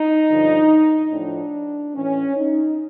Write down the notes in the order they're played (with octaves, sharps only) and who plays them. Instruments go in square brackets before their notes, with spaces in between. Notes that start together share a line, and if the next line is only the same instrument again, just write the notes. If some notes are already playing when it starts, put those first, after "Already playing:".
Already playing: [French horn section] D#4
G2 D3 F3
A2 F3 D4
A2 E3 C#4
D#4